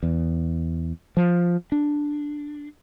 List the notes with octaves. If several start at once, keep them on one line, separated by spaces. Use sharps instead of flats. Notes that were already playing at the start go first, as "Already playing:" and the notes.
E2
F3
D4